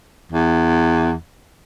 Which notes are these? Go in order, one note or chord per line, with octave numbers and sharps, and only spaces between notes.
E2